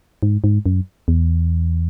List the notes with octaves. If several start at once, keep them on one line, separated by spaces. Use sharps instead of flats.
G#2
G#2
F#2
E2